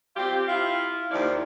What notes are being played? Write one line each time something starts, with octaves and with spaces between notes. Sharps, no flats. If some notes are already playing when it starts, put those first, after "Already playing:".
C4 F4 G4
E4 F4 F5
D#2 F3 E4 D5